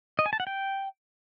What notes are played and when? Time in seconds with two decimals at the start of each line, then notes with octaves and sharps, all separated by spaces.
0.19 D#5
0.26 G#5
0.33 A5
0.40 F#5
0.47 G5